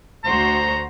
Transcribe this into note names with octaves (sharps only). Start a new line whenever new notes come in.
D2 F#4 C5 A#5